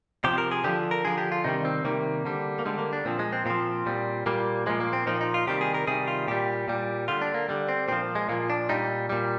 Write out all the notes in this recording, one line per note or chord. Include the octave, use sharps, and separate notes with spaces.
C3 F3 G4
A#4
G#4
D3 F3 G4
A#4
D3 F3 G#4
G4
F4
C3 D#3 G3 D#4
C4
C3 D#3 G3 A#3
D3 G3
A#3
D3 G3 G#3
A#3
D4
A#2 F3 C4
G#3
C4
A#2 F3 C4
A#2 G3
A#2 G3 A#3
A#2 F3 G#3
A#3
C4
A#2 F3 D#4
D#4
F4
C3 D#3 G3 G4
G#4
A#4
C3 D#3 G3 G#4
F4
A#2 G3 G4
A#2 G3
D3 G3 F4
D4
A#3
D3 G3
C4
A#2 F3 C4
G#3
A#2 F3 A#3
D4
A#2 G3 D#4
A#2 G3